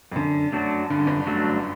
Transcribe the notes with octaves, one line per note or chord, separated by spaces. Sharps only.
F2
F#2 D3
F#3 A3 D4 F#4
G2 D3
F#2
G1 G2
F#3 A3 D4 F#4